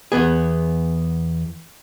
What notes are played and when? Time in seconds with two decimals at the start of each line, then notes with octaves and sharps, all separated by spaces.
0.12 E2 G2 B3 G#4